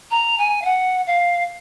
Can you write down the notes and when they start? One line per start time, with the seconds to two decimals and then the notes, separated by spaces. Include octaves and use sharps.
0.11 A#5
0.38 G#5
0.62 F5
0.65 F#5
1.07 F5